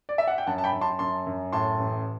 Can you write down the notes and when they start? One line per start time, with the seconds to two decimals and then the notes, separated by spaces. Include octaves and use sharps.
0.09 D5
0.18 E5
0.27 F#5
0.38 G5
0.47 F#2 F#5 A5
0.58 A5
0.64 G5 B5
0.73 F#2
0.81 A5 C6
0.99 F#2 A5 C6
1.27 F#2
1.52 A2 A5 C6
1.79 A1